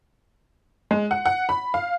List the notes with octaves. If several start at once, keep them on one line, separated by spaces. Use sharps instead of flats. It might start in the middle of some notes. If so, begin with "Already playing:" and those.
G#3
F#5
F#5
B5
F5